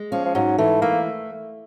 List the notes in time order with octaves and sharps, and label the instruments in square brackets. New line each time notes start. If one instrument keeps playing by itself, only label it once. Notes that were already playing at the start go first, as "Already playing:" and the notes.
Already playing: [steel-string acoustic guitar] G#3
[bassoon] F3 [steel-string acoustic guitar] C#4
[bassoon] F3
[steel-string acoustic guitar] G#2 [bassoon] F#3
[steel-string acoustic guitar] E3 [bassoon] A3
[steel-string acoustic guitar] A3 [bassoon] A#3